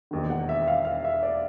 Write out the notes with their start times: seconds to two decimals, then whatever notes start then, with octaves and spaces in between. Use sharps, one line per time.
0.11 E1 D#2 D#3
0.30 F#5
0.49 E5
0.68 F5
0.85 F5
1.05 E5
1.23 D5